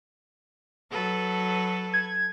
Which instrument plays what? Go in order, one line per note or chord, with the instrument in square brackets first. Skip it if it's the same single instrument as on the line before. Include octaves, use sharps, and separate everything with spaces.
[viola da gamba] F#3 A4 B4
[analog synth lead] G#6